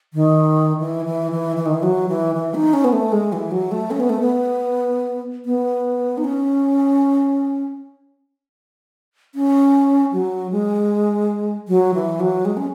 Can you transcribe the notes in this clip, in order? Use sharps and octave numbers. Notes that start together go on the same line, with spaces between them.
D#3
E3
E3
E3
E3
D#3
E3
F#3
E3
E3
D#4
C#4
B3
A3
G#3
E3
F#3
A3
C#4
B3
A3
B3
B3
D#4
C#4
C#4
F#3
G#3
F#3
E3
F#3
G#3
C#4